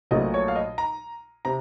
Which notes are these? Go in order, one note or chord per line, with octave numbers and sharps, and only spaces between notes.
A#1 A#2 F#3 A3 D#5
C#5
F5
D#5
A#5
C3 A#5